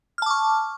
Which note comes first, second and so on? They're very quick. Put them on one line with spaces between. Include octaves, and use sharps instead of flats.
F6 A5 D6 C#6